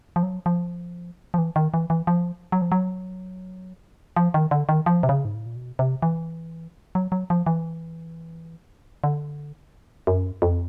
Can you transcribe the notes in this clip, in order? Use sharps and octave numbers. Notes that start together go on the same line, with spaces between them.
F3
F#3
F3
F3
E3
D#3
E3
E3
F3
F#3
F3
F#3
F3
D#3
D3
D#3
F3
C3
C#3
G#2
A2
A#2
B2
C3
E3
F#3
F#3
F3
E3
D3
F#2
F2